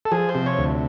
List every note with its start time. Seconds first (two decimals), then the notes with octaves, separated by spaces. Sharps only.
0.05 A4
0.12 F3 G#4
0.29 C5
0.35 C3
0.46 C#5
0.58 D2